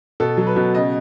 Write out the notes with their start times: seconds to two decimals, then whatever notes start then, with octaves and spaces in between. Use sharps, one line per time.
0.20 B2 A4
0.37 F#3
0.47 B4
0.56 B2
0.75 C#3 D#5